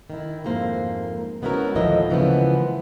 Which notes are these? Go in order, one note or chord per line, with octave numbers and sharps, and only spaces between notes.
D#3 E4
F2 G#2 A#3 C5
G#3 B3 C#4 E4 F#4 A#4
D2 A2 D#3 F3 D#5 E5
C#3 E3 F3 G#3 A#3 B3